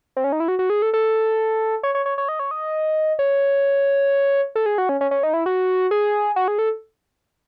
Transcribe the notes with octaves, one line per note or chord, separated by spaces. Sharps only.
C4
C#4
D#4
E4
F#4
F#4
G#4
A4
A4
C#5
C#5
C#5
C#5
D#5
C#5
D#5
C#5
A4
G#4
F#4
C#4
C#4
C#4
D#4
E4
F#4
G#4
F#4
G#4
A4